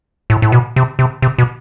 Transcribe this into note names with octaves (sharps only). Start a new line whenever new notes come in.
A2
A2
B2
C3
C3
C3
B2